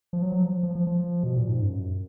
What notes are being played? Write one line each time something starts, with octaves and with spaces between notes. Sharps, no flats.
F3
F#3
F#3
F3
F3
F3
F3
B2
A#2
G#2
F#2